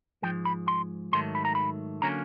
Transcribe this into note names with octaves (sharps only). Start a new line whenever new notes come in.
G#2 F3 G#3 G5
B5
C6
G#2 D#3 F#3 A3 C6
B5
A#5
B5
D3 F#3 A#3 C#4 A#5